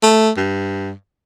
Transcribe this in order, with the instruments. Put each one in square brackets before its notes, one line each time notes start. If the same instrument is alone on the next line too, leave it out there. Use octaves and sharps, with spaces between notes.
[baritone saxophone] A3
G2